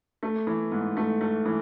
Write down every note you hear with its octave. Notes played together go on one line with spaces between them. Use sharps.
A3
E3
G#2
A3
A3
E3